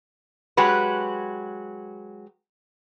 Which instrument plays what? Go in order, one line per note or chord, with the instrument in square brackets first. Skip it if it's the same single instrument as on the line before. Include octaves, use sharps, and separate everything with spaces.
[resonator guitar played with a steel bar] F#3 G#3 F#4 G4 B4